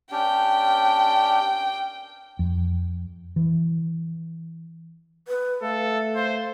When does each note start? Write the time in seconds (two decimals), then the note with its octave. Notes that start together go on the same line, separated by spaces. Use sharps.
0.12 C#4 D4 G4 G5
2.39 F2
3.36 E3
5.28 B4
5.63 A3 A4 F5
6.16 C5 F5